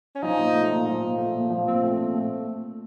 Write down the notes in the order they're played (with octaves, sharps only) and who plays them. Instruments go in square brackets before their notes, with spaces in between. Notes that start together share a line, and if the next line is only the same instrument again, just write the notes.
[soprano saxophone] C#4
[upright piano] F3 [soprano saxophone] D#4
[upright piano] A#2
A3
A#2
F3
A#2
A3
A#2
F3
[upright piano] A#2 [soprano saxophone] C4
[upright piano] A3
A#2
A3